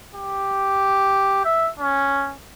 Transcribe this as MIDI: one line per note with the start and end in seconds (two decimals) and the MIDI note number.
0.15 1.42 67
1.45 1.69 76
1.79 2.33 61